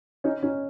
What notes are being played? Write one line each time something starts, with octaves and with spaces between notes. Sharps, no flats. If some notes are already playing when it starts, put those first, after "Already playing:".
C#4 D#4
C#4 D#4